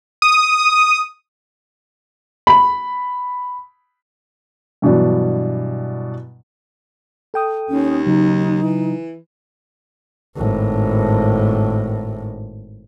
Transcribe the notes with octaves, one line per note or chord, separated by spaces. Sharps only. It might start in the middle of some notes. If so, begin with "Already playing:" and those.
D#6
B5
G2 B2 E3 F#3 D4
A4 G5 D#6
D#2 C#4
C#3 F#3 D#4
E3
G#1 A2